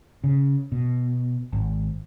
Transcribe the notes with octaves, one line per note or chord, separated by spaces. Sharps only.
C#3
B2
G#1